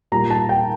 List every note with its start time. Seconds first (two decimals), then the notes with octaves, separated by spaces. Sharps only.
0.12 A#2 G3 A#5
0.31 A5
0.49 G5